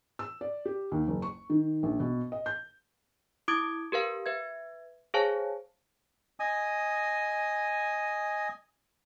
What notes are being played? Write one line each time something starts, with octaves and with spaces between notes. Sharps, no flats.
E6
D5
G4
D#2
F#1
C#6
D#3
A#1
B2
D#5
G6
E4 D6 D#6 G#6 D7
G4 A#4 B4 F5
B4 E5 G#6
G#4 C5 C#5 F5 G#5 A5
D#5 G#5 D#6